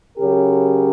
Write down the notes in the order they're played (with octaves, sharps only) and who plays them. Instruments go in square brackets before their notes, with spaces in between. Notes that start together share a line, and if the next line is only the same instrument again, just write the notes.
[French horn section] C#3 F#3 C#4 G4 A#4